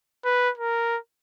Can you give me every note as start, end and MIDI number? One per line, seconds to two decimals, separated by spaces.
0.25 0.51 71
0.58 0.98 70